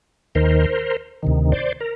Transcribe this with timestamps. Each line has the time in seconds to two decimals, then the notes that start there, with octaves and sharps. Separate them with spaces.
0.35 D#2 D#3 A#4 C5
1.23 D2 C3 D#3
1.52 C5 D5
1.81 A#4